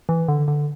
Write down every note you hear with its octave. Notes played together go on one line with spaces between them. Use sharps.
E3
D3
D3